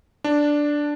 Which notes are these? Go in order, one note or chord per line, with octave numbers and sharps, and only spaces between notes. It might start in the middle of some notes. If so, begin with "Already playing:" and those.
D4